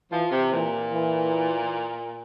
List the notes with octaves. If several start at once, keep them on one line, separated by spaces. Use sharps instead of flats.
E3 F3
C3
A#2 E3
E3